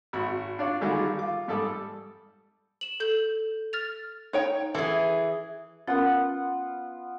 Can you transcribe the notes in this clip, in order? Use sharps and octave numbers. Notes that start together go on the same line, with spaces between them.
G#1 F#4 B5
D4 F4 C#5 D5
D3 D#3 G3 G#3 F4 F#4
F4 D6
G#2 G3 A4 D5 D#6
E7 F#7
A4 G6 F#7
F6 A6 F7
D#4 C#5 G5
E3 G#4 A4
B3 C#4 F4 A#4 F#5